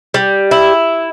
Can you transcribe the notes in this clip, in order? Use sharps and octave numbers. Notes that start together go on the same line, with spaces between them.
G3
E4